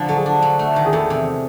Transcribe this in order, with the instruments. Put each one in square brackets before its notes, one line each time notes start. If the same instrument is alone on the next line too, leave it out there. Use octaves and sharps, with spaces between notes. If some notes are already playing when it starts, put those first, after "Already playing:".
Already playing: [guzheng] D3 F3 D4
[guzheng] F#3 [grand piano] A4
[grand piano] G#4
[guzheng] D4
F#3
A3
D#3
[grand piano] G#4
[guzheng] E2 [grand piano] A4
[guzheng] C3